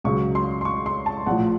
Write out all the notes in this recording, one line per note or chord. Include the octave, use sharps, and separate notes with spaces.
C#2 C#3 F#3 C#6
C6
C6
C#6
C6
A5
A#1 A2 F3 F#5